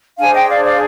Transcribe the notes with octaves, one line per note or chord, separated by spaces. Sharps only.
D4 G#4 C5 F5 G#5
D#5 G5
D5 F5
D5 F5